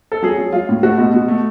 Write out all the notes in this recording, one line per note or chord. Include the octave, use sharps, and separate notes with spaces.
A4
F#3 G#4
F#3
F#3 F4
A2
A3 F#4
B2
B2
A3